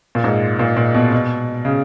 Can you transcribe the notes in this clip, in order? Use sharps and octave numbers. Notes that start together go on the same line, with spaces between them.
A#2
G#2
A#2
A#2
B2
B2
C#3